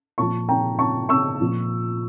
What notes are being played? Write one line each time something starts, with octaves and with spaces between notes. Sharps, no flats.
A#2 F3 A5 C#6
G5 A#5
A5 C#6
C#6 E6
A#2 F3